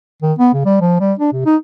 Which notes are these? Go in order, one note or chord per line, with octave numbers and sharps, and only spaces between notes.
D#3
B3
C#3
G3
F3
G3
D4
C3
D#4